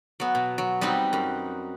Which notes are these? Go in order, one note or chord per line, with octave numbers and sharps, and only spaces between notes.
F#3 B3
B2
F#3
G3 B3 C4 D#4
F#2